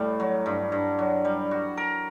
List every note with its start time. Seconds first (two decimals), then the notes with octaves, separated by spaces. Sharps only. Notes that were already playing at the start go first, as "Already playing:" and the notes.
Already playing: A2 G3
0.20 F#3
0.46 G2
0.72 G2
0.99 F#3
1.25 G3
1.51 F#4
1.77 A#4